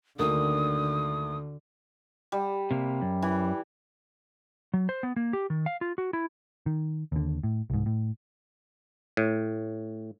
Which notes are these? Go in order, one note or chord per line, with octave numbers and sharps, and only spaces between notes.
D2 D3 D#3 A#3 D#6
G3
C3 A#3
F#2
E3
F#3
C5
B3
A#3
G4
D#3
F5
F4
F#4
E4
D#3
D#2 D3
A2
C2 G#2
A2
A2